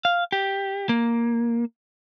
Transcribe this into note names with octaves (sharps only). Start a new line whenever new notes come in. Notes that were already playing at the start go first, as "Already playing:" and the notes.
F5
G4
A#3